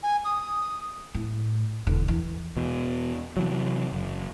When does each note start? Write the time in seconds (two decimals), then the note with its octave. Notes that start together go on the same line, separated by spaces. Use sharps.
0.03 G#5
0.25 D#6
1.14 A2
1.87 E1 D3
2.08 E3
2.57 E2 B2
3.37 C3 E3 F#3
3.92 F#1